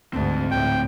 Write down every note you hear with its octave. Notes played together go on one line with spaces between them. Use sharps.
D2 G#2 C4 A5
D2 A2 G5